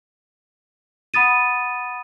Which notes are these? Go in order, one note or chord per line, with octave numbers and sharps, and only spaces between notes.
F#5 B5 D#6 A6 D#7